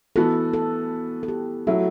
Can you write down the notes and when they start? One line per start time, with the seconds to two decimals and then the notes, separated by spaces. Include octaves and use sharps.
0.16 E3 B3 F#4 A4
0.53 A4
1.23 A4
1.28 G4
1.67 F#3 A3 E4 F#4